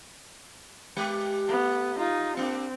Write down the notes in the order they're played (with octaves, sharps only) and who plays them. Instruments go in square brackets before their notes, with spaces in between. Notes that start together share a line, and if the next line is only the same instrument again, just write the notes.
[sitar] G#3 G4 B4
[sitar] A3 [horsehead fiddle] B3
[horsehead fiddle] D#4 F4
[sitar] A#3 D4 [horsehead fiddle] C4